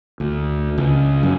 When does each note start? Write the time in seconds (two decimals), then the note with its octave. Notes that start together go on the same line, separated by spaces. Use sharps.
0.20 D2
0.78 C#2
1.23 F#2